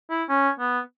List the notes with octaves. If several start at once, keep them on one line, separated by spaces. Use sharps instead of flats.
E4
C#4
B3